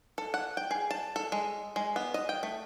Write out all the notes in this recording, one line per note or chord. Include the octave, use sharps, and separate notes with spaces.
A4
F#5
G5
G#4
A5
A4
G#3
G#3
B3
D#5
G5
A3